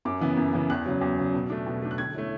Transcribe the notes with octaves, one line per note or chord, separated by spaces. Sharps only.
F#2 D6
C#3 E3 B3
F#2
C#3 E3 B3
E2 F#6
C#3 F#3
E2
C#3 F#3
B2
A3 D4
B2
A3 D4
F#6
D3 G#6
A3 C#4 E4